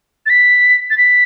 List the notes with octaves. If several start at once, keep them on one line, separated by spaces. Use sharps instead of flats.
A6
B6
A6
B6